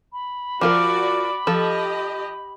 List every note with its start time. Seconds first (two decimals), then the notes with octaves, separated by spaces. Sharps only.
0.13 B5
0.61 F3 F4 F#4 A#4 D5 D6
1.47 F3 G4 A4 D#5